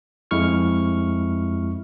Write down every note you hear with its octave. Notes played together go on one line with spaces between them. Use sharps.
F2 G#3 E4 C#6 F6